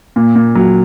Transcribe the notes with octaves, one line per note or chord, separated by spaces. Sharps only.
A#2
A#2
F#3